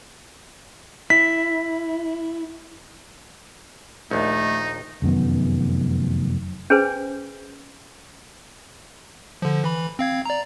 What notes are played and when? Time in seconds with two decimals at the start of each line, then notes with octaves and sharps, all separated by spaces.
1.10 E4 B6
4.11 A#1 D#2 A3 D#4
5.02 F1 F#2 D#3 B3
6.70 C#4 G#4 B4 C5 G#5
9.42 D3 F3
9.64 E3 B5
9.99 C4 F5 G#6
10.25 D5 A#5